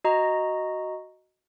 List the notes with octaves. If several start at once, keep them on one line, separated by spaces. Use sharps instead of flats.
F#4 D#5 A#5